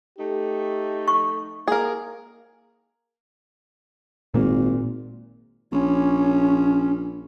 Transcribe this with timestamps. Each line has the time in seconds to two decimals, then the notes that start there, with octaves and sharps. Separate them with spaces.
0.18 A3 D#4 G4
1.08 C#6
1.68 A#3 G#4 A#4
4.34 G#1 A#2 A#3
5.72 A#1 C#4